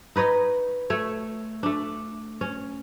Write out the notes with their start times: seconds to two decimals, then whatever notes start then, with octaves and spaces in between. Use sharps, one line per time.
0.16 D#4 B4 C#5 D#5
0.90 A3 C#5
1.63 A3 D4
2.41 C#4